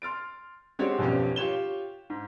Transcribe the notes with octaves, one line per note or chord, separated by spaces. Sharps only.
C6 F6 A6 D7
G#3 C4 F#4 G4 C#5 D5
B1 F2 B3 C#4 G4
F4 G4 C#5 E7 G7
G#2